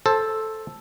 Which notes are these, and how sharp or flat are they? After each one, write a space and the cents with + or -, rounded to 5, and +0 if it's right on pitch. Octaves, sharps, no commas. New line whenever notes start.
A4 +0 C5 +20